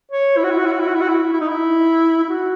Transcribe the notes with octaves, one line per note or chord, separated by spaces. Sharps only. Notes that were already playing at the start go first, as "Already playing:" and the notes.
C#5
E4
F#4
E4
F#4
E4
F#4
E4
F#4
E4
F#4
E4
E4
D#4
E4
E4
F#4